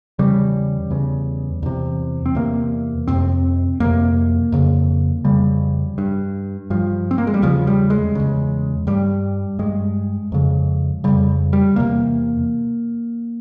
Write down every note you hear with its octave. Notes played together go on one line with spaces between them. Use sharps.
E2 C#3 G3
E2 C#3
E2 C3
C4
E2 C3 A#3
F2 C3 C4
F2 C3 A#3
F2 C#3
F2 C#3 G3
G2
G2 F3
C4
A#3
G#3
G3
E2 C#3 F3
G3
G#3
E2 C#3
G2 G3
G2 G#3
F2 C#3
F2 C#3 G3
G3
E2 C3 A#3